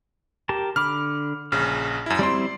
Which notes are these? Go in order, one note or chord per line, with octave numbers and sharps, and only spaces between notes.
G4 A#4 A5
D3 B5 D6 F6
A#1 C#3 F6
F#2 E4
G3 C4 E4 D5 C6